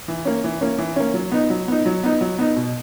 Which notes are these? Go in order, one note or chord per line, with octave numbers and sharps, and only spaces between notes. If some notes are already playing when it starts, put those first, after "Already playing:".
E3
A#3 C#4
E3
A#3 C#4
E3
A#3 C#4
F#3
B3 D#4
F#3
B3 D#4
F#3
B3 D#4
F#3
B3 D#4
B2